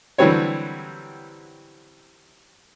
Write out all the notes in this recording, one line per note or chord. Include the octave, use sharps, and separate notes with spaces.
D3 E3 F#3 G3 C4 C#5